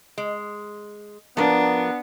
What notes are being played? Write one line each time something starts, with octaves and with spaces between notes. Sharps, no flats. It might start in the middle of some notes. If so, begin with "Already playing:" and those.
G#3
F3 B3 D4 A#4